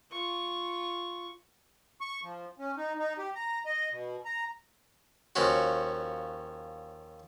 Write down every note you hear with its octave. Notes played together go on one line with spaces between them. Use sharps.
F4 C#6
C#6
F3
C#4
D#4
D#4
G4
A#5
D#5
B2
A#5
D#2 F3 C#4 F#4